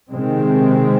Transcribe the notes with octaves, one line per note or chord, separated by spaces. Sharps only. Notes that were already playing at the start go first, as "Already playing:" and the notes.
C3 D#3 G#3 C4